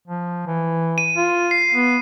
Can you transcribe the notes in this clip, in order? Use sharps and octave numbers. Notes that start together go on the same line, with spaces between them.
F3
E3
D#7
F4
C7
B3